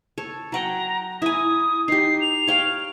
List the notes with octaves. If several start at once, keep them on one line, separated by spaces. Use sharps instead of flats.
A4 C#5
F#3 F#5 G5 A#5
E4 G#5 D#6
D#4 G4 C7
F7
C#5 F5 G5